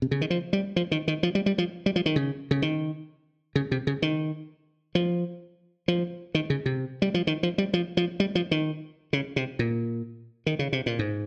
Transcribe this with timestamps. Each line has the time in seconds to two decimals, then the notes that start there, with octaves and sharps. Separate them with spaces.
0.02 C3
0.11 C#3
0.21 D#3
0.30 F3
0.53 G3
0.76 F3
0.91 D#3
1.08 D#3
1.23 F3
1.35 G3
1.46 G3
1.58 F3
1.86 G3
1.96 F3
2.06 D#3
2.16 C#3
2.51 C#3
2.62 D#3
3.55 C#3
3.71 C3
3.87 C#3
4.02 D#3
4.95 F3
5.88 F3
6.35 D#3
6.50 C#3
6.66 C3
7.02 G3
7.14 F3
7.27 D#3
7.43 F3
7.58 G3
7.74 F3
7.97 F3
8.20 G3
8.35 F3
8.51 D#3
9.13 C#3
9.36 C3
9.59 A#2
10.46 D#3
10.59 C#3
10.73 C3
10.86 A#2
10.99 G#2